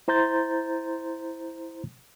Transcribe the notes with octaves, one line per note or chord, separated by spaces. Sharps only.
E4 C5 A#5 C6 G6 A6